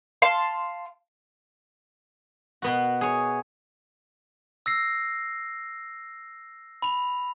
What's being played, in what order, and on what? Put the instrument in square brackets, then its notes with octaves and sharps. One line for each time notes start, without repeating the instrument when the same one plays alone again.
[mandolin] F5 A5 C6
[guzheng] B2 B3 F#4
G#4 C#5
[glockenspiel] E6 A#6 C7
B5 F7